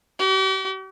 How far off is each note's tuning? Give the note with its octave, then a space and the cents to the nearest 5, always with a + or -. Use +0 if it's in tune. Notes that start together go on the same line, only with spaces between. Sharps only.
G4 -45